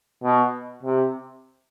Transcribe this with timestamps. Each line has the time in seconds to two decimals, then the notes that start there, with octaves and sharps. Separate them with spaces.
0.23 B2
0.83 C3